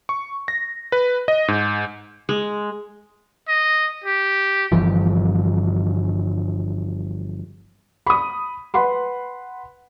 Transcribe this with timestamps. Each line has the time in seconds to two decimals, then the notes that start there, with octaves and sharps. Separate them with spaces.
0.09 C#6
0.48 A#6
0.92 B4
1.28 D#5
1.48 G#2
2.29 G#3
3.48 D#5
4.04 G4
4.72 G1 G2 E3 F3
8.06 B5 D#6
8.74 B4 F#5 B5 C6